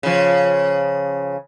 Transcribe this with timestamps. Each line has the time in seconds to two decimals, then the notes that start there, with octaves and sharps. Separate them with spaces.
0.03 C#3 F3